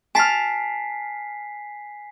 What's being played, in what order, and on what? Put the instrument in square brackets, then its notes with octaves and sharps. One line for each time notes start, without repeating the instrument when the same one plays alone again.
[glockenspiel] G#5 B6 C7 [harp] A5 F6